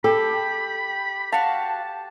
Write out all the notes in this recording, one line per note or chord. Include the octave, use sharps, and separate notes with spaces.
G4 A4 B5
F#4 F5 A5